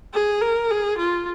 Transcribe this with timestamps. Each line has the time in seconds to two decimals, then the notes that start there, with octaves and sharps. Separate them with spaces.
0.13 G#4
0.41 A#4
0.70 G#4
0.98 F4